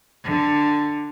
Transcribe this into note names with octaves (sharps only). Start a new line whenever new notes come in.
D3